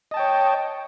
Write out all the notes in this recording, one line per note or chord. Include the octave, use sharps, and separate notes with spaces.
C#5 D#5 G5 A5